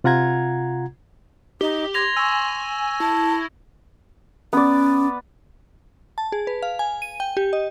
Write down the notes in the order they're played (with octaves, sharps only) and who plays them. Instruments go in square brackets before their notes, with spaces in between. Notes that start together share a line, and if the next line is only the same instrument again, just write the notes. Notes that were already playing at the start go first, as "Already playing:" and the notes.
[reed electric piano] C3 F4 F#5 A#5 G#6
[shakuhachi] D#4 [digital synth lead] G4 [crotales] G7
[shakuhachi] C6 [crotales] G#6 A#6 F7
[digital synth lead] G#5 [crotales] C#6 E6
[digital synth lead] E4 [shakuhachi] A5
[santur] B3 D5 [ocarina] C#4
[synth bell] A5
G#4
B4
F5
G#5
D#7
G5
G4
D#5